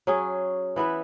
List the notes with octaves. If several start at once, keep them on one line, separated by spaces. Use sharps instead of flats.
F#3 C#4 G#4
E3 B3 E4 B4